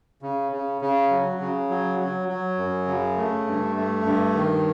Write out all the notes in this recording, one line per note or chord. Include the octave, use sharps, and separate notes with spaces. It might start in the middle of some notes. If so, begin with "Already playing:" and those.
C#3
C#3
C#3
F#3
C#3
F#3
F#3
F#3
F#2
C#3
A3
G2
A3
G2
D#3